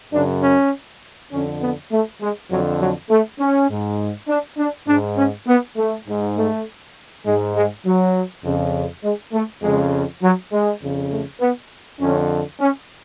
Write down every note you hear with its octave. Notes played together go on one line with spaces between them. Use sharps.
F#2 C#3 D4
C#4
F2 D3 C#4
B3
A3
G#3
F2 D3 F#3
F#3
A3
C#4
G#2
D4
D4
G#2 D4
C#4
B3
A3
G#2
A3
G#2 G#3
G#3
F#3
F2 C#3
G#3
A3
F2 C#3 G#3
F#3
G#3
F2 C#3
A3
B3
F2 D3 C#4
C#4